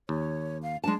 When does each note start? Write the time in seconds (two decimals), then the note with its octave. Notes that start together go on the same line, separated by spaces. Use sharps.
0.09 D#2 C#5
0.63 F5
0.84 G#3 D4 A5